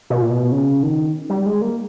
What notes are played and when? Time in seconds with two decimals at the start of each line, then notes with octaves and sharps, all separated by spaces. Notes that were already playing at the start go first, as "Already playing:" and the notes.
0.10 B2
0.22 A#2
0.31 B2
0.52 C#3
0.83 D#3
1.30 G3
1.46 G#3
1.62 A#3